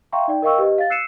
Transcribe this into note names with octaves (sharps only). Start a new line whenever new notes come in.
E5 F5 G5 A#5 C6 C#6
D#4 D5 G5
A#4 D#5 F5 G5 C#6 E6
G4 B4 D#5
F5 A6
E6 F#6 C7 C#7 D#7 E7